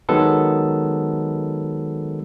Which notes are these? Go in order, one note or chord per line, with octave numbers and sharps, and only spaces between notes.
D#3 F#3 G#3 B3 A4 B4